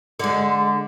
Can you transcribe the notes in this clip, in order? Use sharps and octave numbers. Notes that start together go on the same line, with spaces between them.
D3 G#3